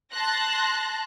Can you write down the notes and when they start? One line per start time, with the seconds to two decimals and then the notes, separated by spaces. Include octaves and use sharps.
0.13 A5 C6 F#6 A#6